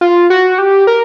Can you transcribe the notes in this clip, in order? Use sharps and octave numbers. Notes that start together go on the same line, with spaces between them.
F4
F#4
G4
A#4